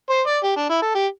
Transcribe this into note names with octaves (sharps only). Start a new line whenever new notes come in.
C5
D5
G4
D4
E4
A4
G4